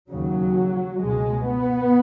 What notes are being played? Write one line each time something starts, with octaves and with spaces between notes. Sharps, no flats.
D#2 C#3 F#3
C#2 B2 G#3
B3